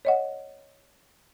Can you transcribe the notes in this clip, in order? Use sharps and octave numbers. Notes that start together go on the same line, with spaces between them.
C#5 D#5 F#5